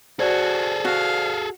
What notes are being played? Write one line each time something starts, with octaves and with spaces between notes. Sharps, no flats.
F#4 G#4 A4 C5 D5 G#6
F#4 F5